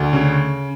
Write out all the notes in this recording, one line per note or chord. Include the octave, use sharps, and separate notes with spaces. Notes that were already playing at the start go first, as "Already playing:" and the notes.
Already playing: D2
C#3